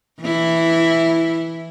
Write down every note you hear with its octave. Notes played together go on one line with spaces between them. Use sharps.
E3 E4